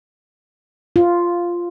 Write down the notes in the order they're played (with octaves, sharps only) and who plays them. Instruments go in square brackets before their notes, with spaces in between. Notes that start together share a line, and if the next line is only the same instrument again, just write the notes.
[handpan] F4